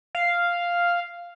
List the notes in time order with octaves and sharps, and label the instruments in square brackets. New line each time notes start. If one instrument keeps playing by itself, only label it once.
[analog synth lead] F5